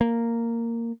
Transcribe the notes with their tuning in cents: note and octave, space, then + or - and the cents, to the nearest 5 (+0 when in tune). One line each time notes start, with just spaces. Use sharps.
A#3 -10